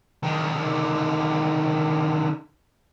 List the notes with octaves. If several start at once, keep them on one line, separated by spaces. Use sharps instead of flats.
D3 D#3